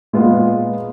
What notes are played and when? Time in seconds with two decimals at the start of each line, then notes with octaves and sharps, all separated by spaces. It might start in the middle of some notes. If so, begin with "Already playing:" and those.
0.13 A#2 G#3 B3 F4